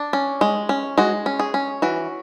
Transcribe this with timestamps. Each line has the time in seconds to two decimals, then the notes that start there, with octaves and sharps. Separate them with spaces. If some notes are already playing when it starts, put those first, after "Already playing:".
Already playing: D4
0.13 C#4
0.41 G#3
0.69 C#4
0.98 G#3 F#4
1.26 C#4
1.39 G#4
1.54 C#4
1.82 E3 F#4